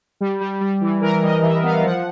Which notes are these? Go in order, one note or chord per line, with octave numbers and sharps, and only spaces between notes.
G3
G3
G3
E3
E3 A#4
G3 D#5
E3 E5
B3 F5
F3 F#5